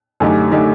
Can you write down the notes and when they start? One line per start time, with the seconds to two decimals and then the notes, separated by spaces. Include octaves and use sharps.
0.20 F#2 D3 A3 D#4 G4
0.52 D3 A3 D#4 G4